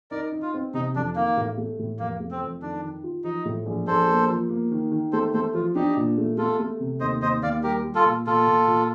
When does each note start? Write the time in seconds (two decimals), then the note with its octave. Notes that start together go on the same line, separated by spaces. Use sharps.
0.11 D#4 A#4 D5
0.32 D#4
0.42 F4
0.54 C4
0.74 C3 D#4
0.96 F2 D4
1.15 D#3 A#3
1.37 A2
1.58 A3
1.79 A2
1.99 F1 A#3
2.20 A3
2.31 C4
2.41 F2
2.62 D#3 D4
2.83 D#3
3.04 F4
3.24 F3 D#4
3.45 A2
3.66 A#1
3.87 A#1 A4 C5
4.08 A#3
4.30 F3
4.50 A#3
4.71 D#3
4.92 D#3
5.13 A3 A4 C5
5.34 A3 A4 C5
5.54 F3 F4
5.75 D4 D#4 G4
5.97 A#2
6.18 A3
6.38 A3 F4 A4
6.59 A3
6.80 C3
7.00 D#2 C5 D#5
7.21 D#2 C5 D#5
7.42 D#2 D5 F5
7.63 G3 G4 A#4
7.84 G3
7.95 F4 A4
8.05 A#2
8.27 A#2 F4 A4
8.47 A#2
8.68 A#2